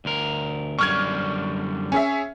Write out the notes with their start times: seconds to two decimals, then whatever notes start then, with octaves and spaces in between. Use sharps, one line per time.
0.05 D2 A#4
0.79 F#2 D3 G3 C#6 F6 G#6
1.92 C#4 G#4 E5